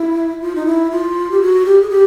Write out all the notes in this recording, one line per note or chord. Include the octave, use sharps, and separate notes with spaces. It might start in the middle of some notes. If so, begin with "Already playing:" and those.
Already playing: E4
F4
D#4
E4
F4
G4
F#4
G4
G#4
G4